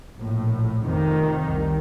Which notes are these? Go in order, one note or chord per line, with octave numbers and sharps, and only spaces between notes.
A#1 A2
F1 F2 C3 D#3
C2